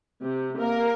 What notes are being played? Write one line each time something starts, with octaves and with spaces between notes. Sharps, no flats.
C3
A#3 A#4